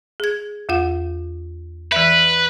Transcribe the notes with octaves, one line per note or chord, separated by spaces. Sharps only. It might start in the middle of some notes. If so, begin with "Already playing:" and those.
G#4 G#6
E2 F4 F#5
E3 B4 E5